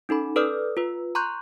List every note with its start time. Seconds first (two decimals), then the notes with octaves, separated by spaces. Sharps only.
0.09 C#4 D#4 A4 B5
0.36 A4 B4 D5 D#6 F6
0.77 F4 B4
1.15 A#5 C6 C#6 F#6 G6